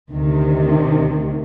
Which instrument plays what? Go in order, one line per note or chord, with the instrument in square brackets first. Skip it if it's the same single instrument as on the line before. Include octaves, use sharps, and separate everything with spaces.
[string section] D2 C3 D#3